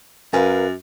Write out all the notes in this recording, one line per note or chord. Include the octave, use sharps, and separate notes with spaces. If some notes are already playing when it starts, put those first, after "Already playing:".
F#2 A#4 B4 F5